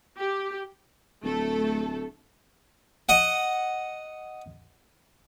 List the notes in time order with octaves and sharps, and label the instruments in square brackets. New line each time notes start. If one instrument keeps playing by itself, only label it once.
[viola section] G4
[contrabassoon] D1 [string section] A3 A4
[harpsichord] D#5 F#5